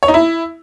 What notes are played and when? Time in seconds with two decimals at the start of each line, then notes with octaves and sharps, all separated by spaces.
0.03 C#5
0.08 D#4
0.14 E4